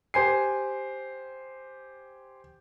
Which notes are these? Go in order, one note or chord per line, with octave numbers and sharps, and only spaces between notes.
G4 C5 G#5 C7